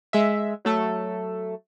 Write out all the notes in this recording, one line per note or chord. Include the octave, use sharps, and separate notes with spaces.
G#3 E5
F#3 A3 A4